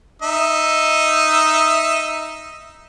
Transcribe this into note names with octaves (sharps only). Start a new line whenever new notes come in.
D#4 E5